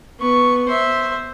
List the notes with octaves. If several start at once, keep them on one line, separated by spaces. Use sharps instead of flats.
B3 C#6
C5 E5